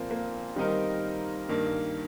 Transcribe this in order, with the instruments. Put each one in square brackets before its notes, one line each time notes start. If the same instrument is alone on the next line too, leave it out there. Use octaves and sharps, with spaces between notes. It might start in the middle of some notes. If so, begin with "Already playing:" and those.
Already playing: [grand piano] A#2 F3 C4 [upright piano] A#3
[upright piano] A#3
[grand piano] D#3 C4 D#4 A#4 [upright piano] G3
[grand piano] G2 D#3 A#3